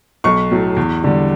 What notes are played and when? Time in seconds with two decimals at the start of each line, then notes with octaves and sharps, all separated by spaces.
0.24 B1 C#6
0.51 A2 F#3 A3
0.77 E2
1.04 D3 G3